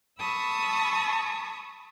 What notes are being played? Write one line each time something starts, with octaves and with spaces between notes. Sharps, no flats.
A5 B5 C#6 D#6 E6